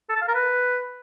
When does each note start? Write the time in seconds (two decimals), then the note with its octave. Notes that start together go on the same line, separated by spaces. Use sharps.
0.09 A4
0.15 A5
0.22 F5
0.28 A#4
0.34 B4